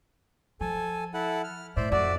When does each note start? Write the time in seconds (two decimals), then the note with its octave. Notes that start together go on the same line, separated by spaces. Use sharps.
0.61 F3 A4 G#5
1.14 E4 A4 F#5
1.44 F6
1.77 A2 C5 D5 E5
1.92 F2 F#4 D5 E5